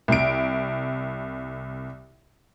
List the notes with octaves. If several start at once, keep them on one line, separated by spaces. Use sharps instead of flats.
C2 D7